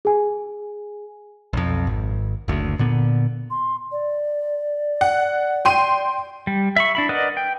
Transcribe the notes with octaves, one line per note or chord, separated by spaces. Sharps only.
G#4 G#5
B1 F2
G#1
F#1 D2
A#2 D3 B3
C6
D5
F#5
G5 C6 D#7
G3
E5 B5 C#6
D4 E4 B5
A#4 B4 D5 D#5 F#5
G5